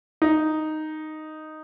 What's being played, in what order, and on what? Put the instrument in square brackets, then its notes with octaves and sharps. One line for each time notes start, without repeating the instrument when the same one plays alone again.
[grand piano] D#4